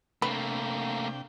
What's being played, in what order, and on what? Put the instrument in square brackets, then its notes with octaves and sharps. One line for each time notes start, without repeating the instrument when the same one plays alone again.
[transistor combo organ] C3 D4 G5 [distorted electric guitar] A3 A#3 [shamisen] B4